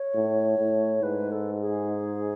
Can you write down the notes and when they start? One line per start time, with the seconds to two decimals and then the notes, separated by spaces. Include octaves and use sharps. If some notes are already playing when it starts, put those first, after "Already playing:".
Already playing: C#5
0.15 A2
0.59 A2
1.03 G#2 B4
1.32 A4
1.55 A4
1.61 G#4